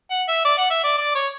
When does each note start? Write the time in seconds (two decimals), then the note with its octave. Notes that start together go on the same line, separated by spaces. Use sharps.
0.11 F#5
0.28 E5
0.45 D5
0.58 F#5
0.71 E5
0.84 D5
0.98 D5
1.15 C#5